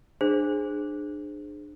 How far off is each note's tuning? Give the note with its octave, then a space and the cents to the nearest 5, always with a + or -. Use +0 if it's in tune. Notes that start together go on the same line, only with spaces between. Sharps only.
D4 +30 G#4 +0 C5 +0